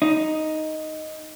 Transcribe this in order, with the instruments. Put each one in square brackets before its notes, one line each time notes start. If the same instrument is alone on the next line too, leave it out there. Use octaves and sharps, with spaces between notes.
[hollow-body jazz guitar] D#4